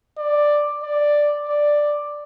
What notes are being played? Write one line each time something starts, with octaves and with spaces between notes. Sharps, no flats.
D5
D5
D5